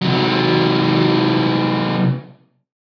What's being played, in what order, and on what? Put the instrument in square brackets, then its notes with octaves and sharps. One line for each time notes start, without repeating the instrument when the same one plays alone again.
[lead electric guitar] C3 F#3